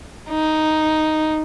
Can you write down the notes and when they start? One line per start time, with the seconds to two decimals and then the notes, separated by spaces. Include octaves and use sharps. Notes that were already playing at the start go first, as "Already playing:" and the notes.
0.30 D#4